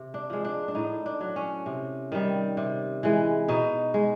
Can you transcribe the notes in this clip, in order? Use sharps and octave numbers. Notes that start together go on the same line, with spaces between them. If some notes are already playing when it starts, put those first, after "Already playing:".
Already playing: C3
D4
F3 G#3
D4
D4
A2 D#4
D4
F#3
C#4
C3
D#3 G3
C3
E3 G#3
B2 D#4
G#3